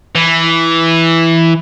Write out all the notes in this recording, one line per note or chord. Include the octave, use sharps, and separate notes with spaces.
E3